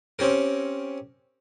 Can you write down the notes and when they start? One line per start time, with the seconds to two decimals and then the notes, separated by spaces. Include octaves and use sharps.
0.19 C4 C#4 G4 A#4